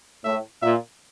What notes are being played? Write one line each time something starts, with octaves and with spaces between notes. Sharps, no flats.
A2 E5
A#2 E5